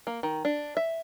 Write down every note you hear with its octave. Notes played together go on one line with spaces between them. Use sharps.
A#3
D#3
D4
E5